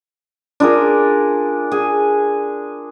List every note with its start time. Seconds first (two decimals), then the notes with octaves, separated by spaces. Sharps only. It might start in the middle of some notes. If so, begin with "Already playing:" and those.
0.60 D4 F4 G#4 A#4
1.72 G#4